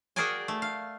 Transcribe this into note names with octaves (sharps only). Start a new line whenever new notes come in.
F#4 G#4 A#4 D5 G5 G#5
A3
F5